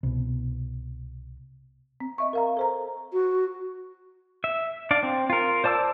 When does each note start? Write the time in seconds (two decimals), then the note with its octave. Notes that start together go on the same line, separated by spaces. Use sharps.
0.03 C2 B2
2.00 C4
2.18 D#5 E5 C#6
2.33 A#4 F5 A#5
2.57 A4 C5 A#5
3.13 F#4
4.44 E5
4.91 D4 D5 F5
5.03 C4
5.30 F4 A#4
5.64 C5 D5 A5 D6 E6